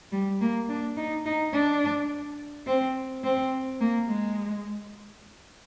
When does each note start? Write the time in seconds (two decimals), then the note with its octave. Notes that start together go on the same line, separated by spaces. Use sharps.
0.12 G3
0.41 A#3
0.69 D4
0.97 D#4
1.26 D#4
1.53 D4
2.67 C4
3.24 C4
3.80 A#3
4.08 G#3